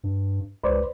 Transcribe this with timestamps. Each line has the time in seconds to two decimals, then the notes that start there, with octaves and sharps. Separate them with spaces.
0.04 G2
0.63 C#2 B4 C5 D5